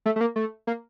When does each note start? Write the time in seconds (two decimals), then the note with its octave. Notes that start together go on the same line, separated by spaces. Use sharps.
0.06 A3
0.16 A3
0.21 A#3
0.36 A3
0.67 A#3